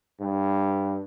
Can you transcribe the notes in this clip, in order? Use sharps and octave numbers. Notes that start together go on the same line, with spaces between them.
G2